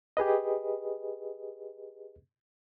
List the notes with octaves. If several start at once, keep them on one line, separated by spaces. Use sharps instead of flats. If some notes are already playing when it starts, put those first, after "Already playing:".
G4 G#4 B4 D#5